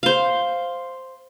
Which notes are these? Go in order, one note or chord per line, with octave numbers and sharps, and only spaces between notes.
C5 F5